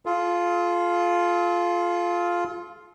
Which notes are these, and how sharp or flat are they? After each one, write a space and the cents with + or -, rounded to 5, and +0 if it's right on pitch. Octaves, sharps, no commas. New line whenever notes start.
F4 +0 A4 -45